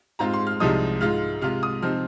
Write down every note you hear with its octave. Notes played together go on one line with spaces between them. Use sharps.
G#2 G#3 C4 F4 A#5
C6
F6
C2 C3 F3 G#3 D#4 D#6
G#2 G#3 F4 F6
C3 G#3 F4 F6
D#6
C3 F3 C4 D#4 F6